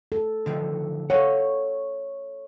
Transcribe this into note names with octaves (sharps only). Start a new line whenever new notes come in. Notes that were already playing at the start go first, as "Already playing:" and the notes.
A4
D3 D#3 F3
A4 C#5 F5 F#5